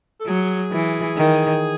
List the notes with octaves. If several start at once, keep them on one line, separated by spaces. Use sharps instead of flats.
A4
F#3 G#4
E3
D#3